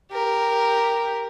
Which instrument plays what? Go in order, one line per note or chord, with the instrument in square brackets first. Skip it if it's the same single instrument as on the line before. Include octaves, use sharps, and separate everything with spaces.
[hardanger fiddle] G4 A#4